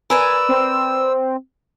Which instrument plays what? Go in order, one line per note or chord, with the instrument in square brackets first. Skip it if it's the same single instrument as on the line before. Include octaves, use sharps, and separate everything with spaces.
[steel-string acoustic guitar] A#4 B4 D5 [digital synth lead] G#5 [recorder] E6
[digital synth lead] C4